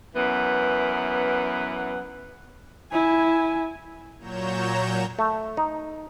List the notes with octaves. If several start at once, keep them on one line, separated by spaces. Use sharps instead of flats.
F#2 E3 B3
E4 G#5
A#2 F#3 C#5 A#5 G6 E7
A3
D#4